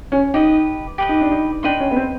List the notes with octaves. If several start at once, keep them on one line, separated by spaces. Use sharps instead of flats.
C#4
D#4 G4 B4 D#5
G4 B4 D#5
D#4
D4
D#4
D4 B4 D#5 G5 C6
C#4
B3
C4